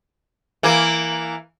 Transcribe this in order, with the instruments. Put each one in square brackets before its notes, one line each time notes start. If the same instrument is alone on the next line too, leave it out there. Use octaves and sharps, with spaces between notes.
[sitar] E3 A#3